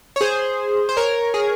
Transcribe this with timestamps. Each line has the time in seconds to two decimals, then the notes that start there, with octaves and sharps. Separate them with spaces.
0.16 C#5
0.21 G#4 C5
0.89 C5
0.97 A#4 C#5
1.34 G#4